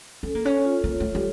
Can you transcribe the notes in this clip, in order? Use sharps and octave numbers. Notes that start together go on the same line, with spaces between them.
C#4 A4
A#3
C#4 A4
F4
A#3 C#5
A3
A4
G3